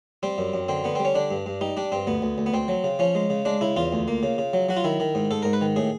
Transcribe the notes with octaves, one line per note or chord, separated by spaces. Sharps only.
G3 C4
F#2
F#2
D3 C4
D3 B3
G3 C4
C#4
D3 D4
G2
G2
G3 D#4
G3 D4
G2 C4
D2 B3
D2
D2
B3
D2 C4
F#3
C#3
F3 C#4
G#3
C#3
G#3 D4
C#3 E4
E2 F4
D2
A#3
C#3
C#3
F#3
F#3 F#4
F4
D#3 E4
D#3
G#2
G#2 A4
G#2 A#4
B4
D#3
A2 G#4